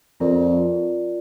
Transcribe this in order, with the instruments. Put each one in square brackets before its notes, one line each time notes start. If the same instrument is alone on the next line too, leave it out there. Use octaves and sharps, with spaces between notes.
[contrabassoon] F2 [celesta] F4 A#4 D5